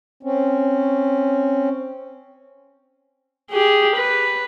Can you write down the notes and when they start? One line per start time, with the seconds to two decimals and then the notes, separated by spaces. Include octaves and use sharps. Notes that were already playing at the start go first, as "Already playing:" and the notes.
0.23 C4 C#4
3.52 G4 G#4
3.96 B4